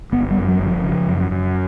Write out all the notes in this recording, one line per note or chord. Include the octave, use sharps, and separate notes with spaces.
G1 B3
G3
F#2
F#3
G1
F3
C#3
F#2
F#2